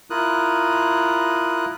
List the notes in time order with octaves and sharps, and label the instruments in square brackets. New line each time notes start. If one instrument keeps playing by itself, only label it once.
[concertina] E4 F4 A#4 D#6 F#6